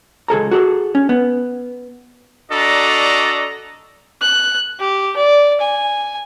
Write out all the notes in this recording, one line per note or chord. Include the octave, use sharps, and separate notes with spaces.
C#2 G#4 A4 A#5
F#4 G#4 A4
C#4
B3
D4 F#4 A4 D5 D#5 A#5
F#6
G4
D5
G#5